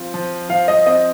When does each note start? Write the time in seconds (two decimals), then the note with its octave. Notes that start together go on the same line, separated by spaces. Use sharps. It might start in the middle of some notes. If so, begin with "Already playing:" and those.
Already playing: F3 C4 F4
0.14 F3
0.49 F3 F5
0.68 D#5
0.86 C4 D#5